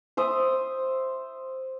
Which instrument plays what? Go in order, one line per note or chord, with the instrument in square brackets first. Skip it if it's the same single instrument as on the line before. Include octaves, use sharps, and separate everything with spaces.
[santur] C5 E5 D#6